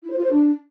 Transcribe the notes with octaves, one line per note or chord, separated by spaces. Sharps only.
E4
C5
F4
C5
D4